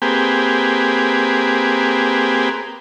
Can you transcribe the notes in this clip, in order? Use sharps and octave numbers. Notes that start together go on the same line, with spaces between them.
A#3 C4 G4 G#4 B4